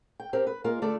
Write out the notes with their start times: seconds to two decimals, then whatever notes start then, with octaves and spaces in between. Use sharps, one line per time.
0.20 G5
0.33 C4 G4 A#4
0.47 B4
0.64 G#3 A#3 F4 A#4
0.82 D3 A3 F4 A4 D5